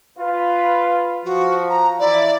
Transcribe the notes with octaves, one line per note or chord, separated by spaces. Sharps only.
F4 B4
F3 F#4
A#5
E3 E4 D5